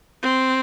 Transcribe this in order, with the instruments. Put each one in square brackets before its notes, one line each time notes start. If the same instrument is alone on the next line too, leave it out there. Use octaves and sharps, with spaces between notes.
[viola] C4